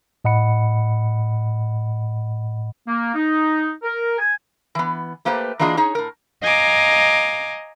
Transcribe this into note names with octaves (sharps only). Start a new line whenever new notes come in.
A2 D#5 F#5 B5 C#7
A#3
D#4
A#4
G#5
E3 B3
A3 A#3 G4 B4 C5
E3 A#3 D4 F4 G#4 D#5
D#4 G#4 C#5
A2 A#4
D#5 F5 G#5 A#5 D6